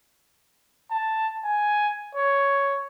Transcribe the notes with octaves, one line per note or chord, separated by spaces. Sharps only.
A5
G#5
C#5